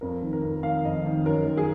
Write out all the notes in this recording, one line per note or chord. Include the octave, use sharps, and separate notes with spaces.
F2 A#4
D#3
A#4
F2
D#3 F5
F2 D#5
D#3
F#2 A#4
D#3
G#4